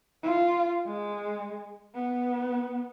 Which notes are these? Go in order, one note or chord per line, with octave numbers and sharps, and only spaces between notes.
F4
G#3
B3